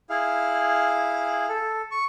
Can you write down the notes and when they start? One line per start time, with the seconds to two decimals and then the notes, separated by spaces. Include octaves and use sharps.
0.10 E4 G#4 F5
1.49 A4
1.91 C#6